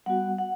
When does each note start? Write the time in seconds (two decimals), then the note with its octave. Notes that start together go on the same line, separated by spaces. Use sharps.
0.06 G3 B3 F#4 F#5
0.38 F#5